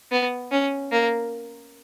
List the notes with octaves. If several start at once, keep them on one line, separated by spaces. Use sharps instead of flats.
B3
C#4
A#3